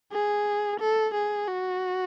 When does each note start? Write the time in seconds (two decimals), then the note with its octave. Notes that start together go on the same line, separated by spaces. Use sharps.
0.12 G#4
0.80 A4
1.14 G#4
1.48 F#4